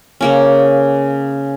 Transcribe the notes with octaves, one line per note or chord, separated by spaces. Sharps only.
C#3 A#3 C#4